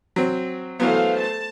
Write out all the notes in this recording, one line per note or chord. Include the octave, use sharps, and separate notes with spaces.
F#3 C4
E3 F#3 A3 B3 C5 F5
A5